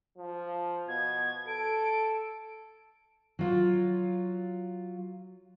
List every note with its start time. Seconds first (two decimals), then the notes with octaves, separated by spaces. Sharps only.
0.18 F3
0.88 B2 G#6
1.47 A4 D7
3.39 F#3 F4